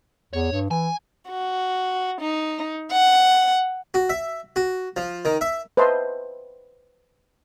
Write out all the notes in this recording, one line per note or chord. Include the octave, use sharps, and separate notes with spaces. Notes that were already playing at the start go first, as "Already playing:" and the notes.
E2 C#5
G2
E3 G#5
F#4
D#4
F#5
F#4
E5
F#4
F3
D#3
E5
B4 C5 D#5 E5 A5 C6